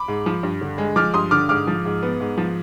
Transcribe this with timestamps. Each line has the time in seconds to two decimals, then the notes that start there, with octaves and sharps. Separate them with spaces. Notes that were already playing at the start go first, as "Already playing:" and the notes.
Already playing: B5 D6
0.08 G#2
0.26 F3
0.43 G2
0.61 D3
0.78 G#3
0.96 F3 D6 F6
1.14 G2 C6 D#6
1.31 D3 D6 F6
1.49 G#2 D6 F6
1.67 F3
1.85 G#2
2.03 B3
2.20 G#2
2.38 F3